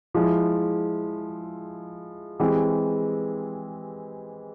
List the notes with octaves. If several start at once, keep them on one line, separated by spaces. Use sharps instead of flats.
F3 G#3 E4
E3 G#3 C4 G4